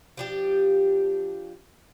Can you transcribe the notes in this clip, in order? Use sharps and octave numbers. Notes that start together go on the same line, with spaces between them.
F3 D4 G4